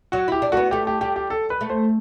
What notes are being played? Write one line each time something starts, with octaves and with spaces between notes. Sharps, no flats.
F#3 F#4
E4 G4
D4
A3 B3 F#4
A3 G4
G4
G3 G4
G4
A4
B4
A3
C5